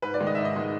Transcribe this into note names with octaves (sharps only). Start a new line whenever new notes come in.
G#2 B4
D5
D#3 G#3
D#5
G#2 E5
D#5
D#3 G#3